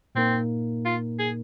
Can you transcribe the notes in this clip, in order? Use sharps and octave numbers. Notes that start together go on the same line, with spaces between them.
A#2 A#3 C4 D#4 A#4
F4
G#4